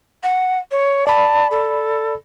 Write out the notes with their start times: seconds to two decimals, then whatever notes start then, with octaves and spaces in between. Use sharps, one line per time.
0.23 F#5
0.71 C#5
1.07 D5 A5 B5
1.51 A4